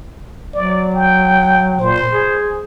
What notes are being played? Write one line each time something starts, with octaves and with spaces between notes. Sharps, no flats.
F#3 D5
G5
A#2 C5
G#4